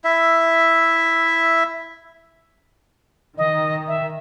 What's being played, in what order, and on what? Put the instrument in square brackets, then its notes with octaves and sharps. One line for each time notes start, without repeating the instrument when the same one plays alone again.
[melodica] E4 E5
[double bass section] D#3 [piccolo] D#5
[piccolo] E5